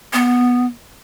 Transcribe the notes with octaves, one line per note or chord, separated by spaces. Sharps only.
B3